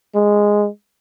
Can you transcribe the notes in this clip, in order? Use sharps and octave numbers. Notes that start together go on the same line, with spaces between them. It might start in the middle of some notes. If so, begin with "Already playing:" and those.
G#3